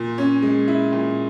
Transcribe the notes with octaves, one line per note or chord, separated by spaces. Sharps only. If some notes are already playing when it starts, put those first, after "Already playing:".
Already playing: A#2
C#4
G#3
E4
A#2